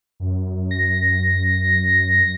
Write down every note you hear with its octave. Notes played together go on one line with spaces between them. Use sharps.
F#2
A#6